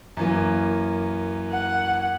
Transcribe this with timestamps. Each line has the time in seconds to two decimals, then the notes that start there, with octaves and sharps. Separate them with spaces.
0.17 F#2 E3 A#3
1.51 F#5